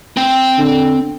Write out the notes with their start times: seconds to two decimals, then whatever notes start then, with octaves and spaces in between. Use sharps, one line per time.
0.17 C4 G5
0.58 D3